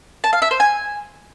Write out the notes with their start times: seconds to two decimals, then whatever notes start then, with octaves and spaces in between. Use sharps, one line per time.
0.24 A5
0.33 F5
0.42 E5
0.51 C5
0.60 G#5